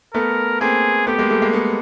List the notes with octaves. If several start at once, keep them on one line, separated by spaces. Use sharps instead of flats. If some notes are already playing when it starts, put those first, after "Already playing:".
A3 B3 A#4
A#3 C4 G#4
A3 B3 G4
G#3 A#3
G3 A3
G#3 A#3
A3 B3